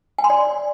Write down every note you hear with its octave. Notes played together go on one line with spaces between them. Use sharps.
G#5
C6
D5